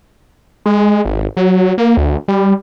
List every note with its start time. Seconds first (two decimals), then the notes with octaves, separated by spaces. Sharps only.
0.66 G#3
1.05 G#1
1.37 F#3
1.78 A#3
1.97 D2
2.28 G3